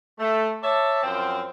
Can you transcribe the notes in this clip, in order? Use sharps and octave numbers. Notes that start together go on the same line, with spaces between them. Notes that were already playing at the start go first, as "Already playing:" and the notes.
A3
C#5 D5 E5 A5
F#2 F3 C4 C5 G5